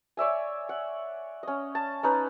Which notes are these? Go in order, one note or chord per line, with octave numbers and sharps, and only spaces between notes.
C#5 D5 E5 G#5
F#5
C#4 D#5
A5
C#4 D#4 B4